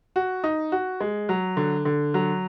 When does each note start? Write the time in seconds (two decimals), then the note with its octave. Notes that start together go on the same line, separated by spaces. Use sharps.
0.16 F#4
0.44 D#4
0.72 F#4
1.00 G#3
1.29 F#3
1.57 D3
1.85 D3
2.14 F#3